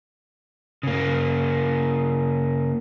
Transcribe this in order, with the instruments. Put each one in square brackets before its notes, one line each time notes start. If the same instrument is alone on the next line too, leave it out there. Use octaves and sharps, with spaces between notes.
[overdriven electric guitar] C#3 A#3